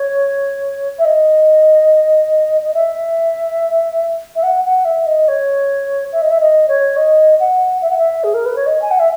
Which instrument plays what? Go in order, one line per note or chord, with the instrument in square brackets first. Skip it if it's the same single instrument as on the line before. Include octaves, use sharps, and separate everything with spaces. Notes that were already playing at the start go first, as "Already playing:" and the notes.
Already playing: [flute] C#5
E5
D#5
D#5
E5
E5
F#5
F#5
E5
D#5
C#5
E5
D#5
E5
D#5
C#5
D#5
F#5
E5
F#5
E5
G#4
A#4
B4
C#5
D#5
G#5
F#5
E5